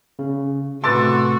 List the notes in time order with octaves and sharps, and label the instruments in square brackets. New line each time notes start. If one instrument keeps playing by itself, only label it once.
[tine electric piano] C#3
[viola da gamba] A2 C3 F#4 [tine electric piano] B4 D6 [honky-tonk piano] C6 E6 A6